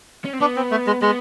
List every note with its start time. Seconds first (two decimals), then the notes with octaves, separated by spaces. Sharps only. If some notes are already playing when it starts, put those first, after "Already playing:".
0.25 C#4
0.33 C4
0.41 B3 D4
0.56 C4
0.71 A3
0.87 G#3
1.02 G#3 B3